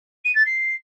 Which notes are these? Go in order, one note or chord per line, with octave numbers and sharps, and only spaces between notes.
D#7
A6
C7